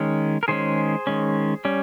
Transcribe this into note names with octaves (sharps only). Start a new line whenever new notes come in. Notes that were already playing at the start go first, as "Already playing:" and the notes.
Already playing: D#3 G#3 C#4
A#4
D#3 G#3 C#4 G#4 C5
D#3 G#3 C#4
G3 C#4